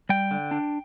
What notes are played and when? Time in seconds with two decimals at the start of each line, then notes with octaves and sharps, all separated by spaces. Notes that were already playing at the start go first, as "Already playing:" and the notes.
0.09 G3 G5
0.31 D3
0.51 D4